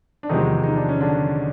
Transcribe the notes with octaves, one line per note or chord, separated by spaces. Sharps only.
D4
E2 C3 D#3 F3 G#3 D#4
D#4
D4
C#4
D3 D4